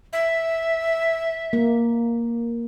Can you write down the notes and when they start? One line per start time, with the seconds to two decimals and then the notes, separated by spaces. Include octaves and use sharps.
0.13 E5
1.53 A#3